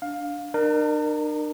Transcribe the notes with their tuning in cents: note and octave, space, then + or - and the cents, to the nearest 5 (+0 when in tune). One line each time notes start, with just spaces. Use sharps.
D4 +0 F5 +15
D4 +45 A#4 +0